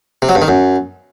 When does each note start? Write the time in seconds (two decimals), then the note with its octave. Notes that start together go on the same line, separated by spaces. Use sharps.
0.22 C3
0.29 F#3
0.35 G2
0.42 D#3
0.48 F#2